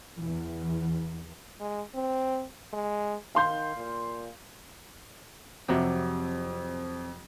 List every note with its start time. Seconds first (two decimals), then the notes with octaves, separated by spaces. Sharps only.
0.18 E2 E3
1.61 G#3
1.95 C4
2.73 G#3
3.35 D#3 F5 C6 G6
3.76 A#2
5.68 F2 C3 F#3 G4